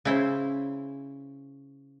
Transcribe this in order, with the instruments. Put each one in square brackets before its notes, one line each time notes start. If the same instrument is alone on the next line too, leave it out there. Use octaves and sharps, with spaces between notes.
[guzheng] C#3 E4 C5